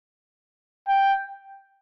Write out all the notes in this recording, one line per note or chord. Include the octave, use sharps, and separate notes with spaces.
G5